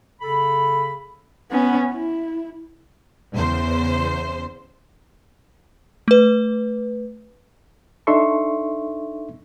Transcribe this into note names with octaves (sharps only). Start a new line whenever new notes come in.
C#3 A4 B5
B3 C#4
E4
E2 C#3 C5
A3 B4
D4 D#4 A4 E5 C6 C#6